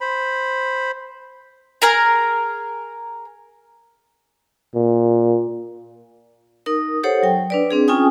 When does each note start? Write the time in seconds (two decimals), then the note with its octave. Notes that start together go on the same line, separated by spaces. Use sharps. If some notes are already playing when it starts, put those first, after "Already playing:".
0.01 C5 B5
1.82 G#4 A#4 A#5
4.75 A#2
6.66 D#4 A#4 D#6
7.03 G4 A4 C5 C#5 F#5
7.23 F#3 G5
7.50 D4 B4 D5
7.71 C4 D4 G#4
7.88 C#4 F4 G#4 G5 G#5 D#6